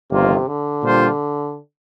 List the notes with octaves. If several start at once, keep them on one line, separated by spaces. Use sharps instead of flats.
G1 F2 C3 D#3 A#3 F4
D3
A#2 G3 D4 F4 C5